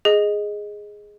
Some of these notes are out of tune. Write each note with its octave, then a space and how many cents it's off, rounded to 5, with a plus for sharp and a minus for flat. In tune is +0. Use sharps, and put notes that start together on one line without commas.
G#4 +0 D#5 +0